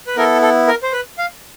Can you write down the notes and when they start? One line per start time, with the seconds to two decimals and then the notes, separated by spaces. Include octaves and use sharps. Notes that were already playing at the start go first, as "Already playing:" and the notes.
0.07 B4
0.16 B3 E4 A4 A#4
0.42 A4
0.67 A#4
0.83 C5
0.93 B4
1.18 F5